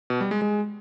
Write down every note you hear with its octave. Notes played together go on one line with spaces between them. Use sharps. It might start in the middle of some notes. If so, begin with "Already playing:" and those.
B2
G3
G#3
G#3